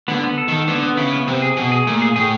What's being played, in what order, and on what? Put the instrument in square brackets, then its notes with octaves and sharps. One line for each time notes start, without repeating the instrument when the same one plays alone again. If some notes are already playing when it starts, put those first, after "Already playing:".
[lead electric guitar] D3 [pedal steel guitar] B3
[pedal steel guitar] B3
A4
[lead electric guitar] D#3 [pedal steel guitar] A4
[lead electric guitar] D3 [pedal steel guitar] B3
[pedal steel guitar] B3
[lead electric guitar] C#3 [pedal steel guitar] E4
[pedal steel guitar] B3
[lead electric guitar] C3 [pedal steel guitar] C4
[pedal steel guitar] G#4
[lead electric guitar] B2 [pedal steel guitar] G#4
[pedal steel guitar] G#4
[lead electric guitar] A#2 [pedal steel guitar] A3
[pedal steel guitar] G#4
[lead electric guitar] A2 [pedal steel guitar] G#4